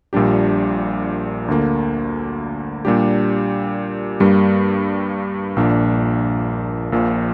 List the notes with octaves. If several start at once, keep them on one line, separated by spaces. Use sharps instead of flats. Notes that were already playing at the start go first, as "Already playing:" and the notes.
A#1 A#2 G3 D4 G4
D2 D3 A#3
A#2 G3 D4 G4
G2 G3 A#3
A#1 A#2 A#3 D4
A#1 A#2 F3